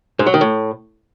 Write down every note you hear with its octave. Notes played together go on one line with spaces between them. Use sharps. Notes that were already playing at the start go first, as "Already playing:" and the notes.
G#2
F#3
D#3
A2